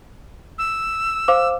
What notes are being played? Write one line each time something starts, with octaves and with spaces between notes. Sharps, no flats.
E6
C5 F5 D6